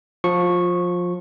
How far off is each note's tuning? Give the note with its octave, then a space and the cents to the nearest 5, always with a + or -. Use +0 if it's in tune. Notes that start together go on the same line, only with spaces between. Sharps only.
F3 +20 C#6 -10